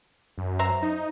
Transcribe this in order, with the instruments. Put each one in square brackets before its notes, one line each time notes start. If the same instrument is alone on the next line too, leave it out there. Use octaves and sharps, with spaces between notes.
[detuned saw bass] F#2
[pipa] C5 E5 A#5
[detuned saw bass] D#4